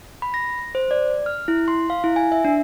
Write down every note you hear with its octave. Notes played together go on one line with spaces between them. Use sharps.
B5
A#6
C5
D5
F6
E4
C6
F5
E4
G#5
E5
D4